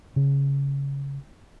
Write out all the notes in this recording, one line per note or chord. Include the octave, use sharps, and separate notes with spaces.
C#3